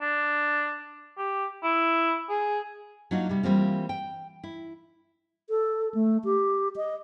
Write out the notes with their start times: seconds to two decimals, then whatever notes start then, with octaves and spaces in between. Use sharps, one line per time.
0.02 D4
1.18 G4
1.63 E4
2.29 G#4
3.11 F#3 A#3 D4 D#4 F4 F#4
3.29 C3 G3
3.43 E3 G3 A#3 C4 F4
3.89 G5
4.43 E4
5.48 A4
5.94 A3
6.25 G4
6.76 D#5